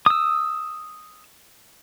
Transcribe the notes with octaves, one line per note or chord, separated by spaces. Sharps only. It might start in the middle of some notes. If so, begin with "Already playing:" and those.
D#6 E6